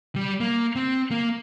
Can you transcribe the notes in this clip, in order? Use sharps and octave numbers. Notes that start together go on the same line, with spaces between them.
G3
A#3
C4
A#3